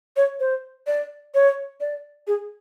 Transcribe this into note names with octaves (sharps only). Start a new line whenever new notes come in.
C#5
C5
D5
C#5
D5
G#4